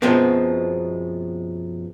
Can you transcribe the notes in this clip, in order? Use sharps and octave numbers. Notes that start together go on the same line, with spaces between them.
F#2 B2 F3 G#3 B3 C4